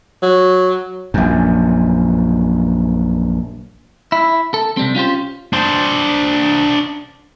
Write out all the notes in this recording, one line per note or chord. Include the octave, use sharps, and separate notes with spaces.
F#3
A#1 F#2
E4
A4
C3 G3 C4
C#4 F4 G4 C5
D4 C5